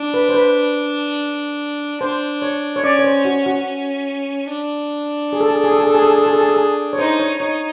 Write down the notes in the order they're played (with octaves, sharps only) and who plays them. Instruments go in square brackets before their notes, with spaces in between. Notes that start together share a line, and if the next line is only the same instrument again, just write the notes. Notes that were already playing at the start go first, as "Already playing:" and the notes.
Already playing: [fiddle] D4
[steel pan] B4
C5
B4
[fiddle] D4 [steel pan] C5
[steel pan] C#5
C#5
[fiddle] C#4 [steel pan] D5
[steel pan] C#5
C5
F#4
F#4
[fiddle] C#4
D4
[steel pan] G#4
A4
G#4
A4
G#4
A4
G#4
A4
G#4
A4
G#4
A4
G#4
A4
G#4
A4
G#4
C#5
[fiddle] D#4 [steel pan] C5
[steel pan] C#5
[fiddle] D#4 [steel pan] C#5